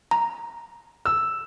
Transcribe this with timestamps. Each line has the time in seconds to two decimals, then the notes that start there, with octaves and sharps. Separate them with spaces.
0.11 A#5
1.05 E6